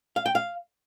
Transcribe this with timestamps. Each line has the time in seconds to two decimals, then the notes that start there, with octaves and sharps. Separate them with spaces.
0.16 F5
0.26 G5
0.35 F5